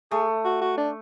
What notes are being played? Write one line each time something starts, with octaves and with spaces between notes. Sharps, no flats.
A3 G#4
F#4
F#4
D4